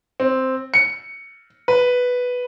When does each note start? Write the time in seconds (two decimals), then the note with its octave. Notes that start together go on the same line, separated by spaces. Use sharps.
0.20 C4
0.74 C#7
1.68 B4